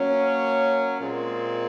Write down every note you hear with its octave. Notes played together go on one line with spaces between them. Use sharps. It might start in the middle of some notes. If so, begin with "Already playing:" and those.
Already playing: F#3 A#3 C#4
A#2 G#3 C4